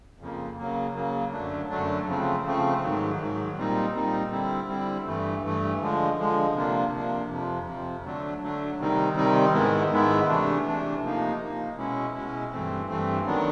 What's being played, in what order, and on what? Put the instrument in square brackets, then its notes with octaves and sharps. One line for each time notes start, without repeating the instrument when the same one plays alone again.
[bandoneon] F2 C#3 F3 A#3
C#3 F#3 A#3
C#3 F#3 A#3
F#2 D3 F#3 A3 D4
F#2 D3 F#3 A3 D4
C#3 F3 A3 C4
C#3 F3 A3 C4
G#2 D#3 F#3
G#2 D#3 F#3
A#2 G3 C4 D#4
A#2 G3 C4 D#4
D3 G3 C4 E4
D3 G3 C4 E4
G2 E3 A3
G2 E3 A3
D3 F3 G#3
D3 F3 G#3
C3 F3 A#3 D4
C3 F3 A#3 D4
F2 C3 F3
F2 C3 F3
D3 F#3 A3 D4
D3 F#3 A3 D4
C3 D#3 G3 C4 D#4
C3 D#3 G3 C4 D#4
G#2 D#3 G#3 B3 E4
G#2 D#3 G#3 B3 E4
C3 E3 A3 D4
C3 E3 A3 D4
C3 F3 A#3 D#4
C3 F3 A#3 D#4
B2 G#3 C#4 E4
B2 G#3 C#4 E4
G2 E3 A3 C4
G2 E3 A3 C4
D#3 F#3 B3 D4